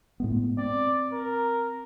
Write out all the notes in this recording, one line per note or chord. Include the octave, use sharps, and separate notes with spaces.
A2 G#3 B3
C4 D5
A#4